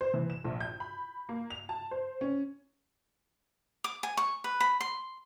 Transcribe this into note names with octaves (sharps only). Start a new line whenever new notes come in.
C5
E3
E7
A#1
G6
B5
A#3
F7
A5
C5
C#4
D6
G#5
C#6
B4
B5
C6